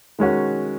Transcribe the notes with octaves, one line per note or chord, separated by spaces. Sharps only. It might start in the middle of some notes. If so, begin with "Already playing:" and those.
D#3 G#3 C#4 F#4